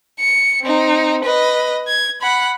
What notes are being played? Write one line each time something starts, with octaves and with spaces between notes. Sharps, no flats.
C#7
C4 D#4
B4 D#5
G#6
F#5 B5